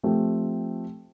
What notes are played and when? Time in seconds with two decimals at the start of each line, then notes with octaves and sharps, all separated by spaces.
0.03 F3 A3 C4 G4